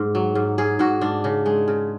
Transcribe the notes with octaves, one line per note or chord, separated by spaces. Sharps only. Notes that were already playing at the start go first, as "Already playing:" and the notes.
Already playing: G#2
F#3
G#2
G#2 G#4
G#2 F#4
G#2 D4
C#3
G#3
C#3